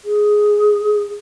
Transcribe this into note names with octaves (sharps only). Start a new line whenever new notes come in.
G#4